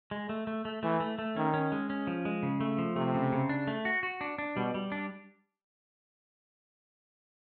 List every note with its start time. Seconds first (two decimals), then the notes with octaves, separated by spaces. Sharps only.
0.11 G#3
0.29 A3
0.47 A3
0.65 A3
0.83 E3 A3
1.00 A3
1.19 A3
1.36 D#3 C#4
1.54 C#4
1.72 G#3
1.90 C#4
2.07 F3
2.25 G#3
2.43 C#3
2.61 A3
2.78 F3
2.96 C3 A3
3.14 C#3
3.32 C#3
3.49 D4
3.67 A3
3.85 F#4
4.03 F#4
4.21 D4
4.38 D4
4.56 B2 G3
4.74 G3
4.92 D4